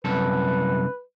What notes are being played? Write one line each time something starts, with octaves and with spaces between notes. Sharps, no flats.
C2 F#2 A4 B4